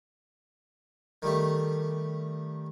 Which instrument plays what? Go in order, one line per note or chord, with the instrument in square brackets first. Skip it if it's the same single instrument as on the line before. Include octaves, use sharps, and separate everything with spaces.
[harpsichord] D#3 G3 A3